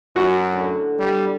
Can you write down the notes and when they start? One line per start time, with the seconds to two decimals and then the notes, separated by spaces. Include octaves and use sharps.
0.16 F#2 F#4
0.53 A2 D3 F#3
0.99 G3 G4